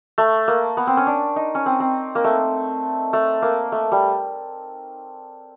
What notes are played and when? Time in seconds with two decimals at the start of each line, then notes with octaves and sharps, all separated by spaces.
0.18 A3
0.48 A#3
0.77 B3
0.87 C4
0.97 C#4
1.07 D4
1.36 D#4
1.55 C#4
1.66 C4
1.80 C4
2.15 A#3
2.24 A3
3.13 A3
3.42 A#3
3.72 A3
3.92 G3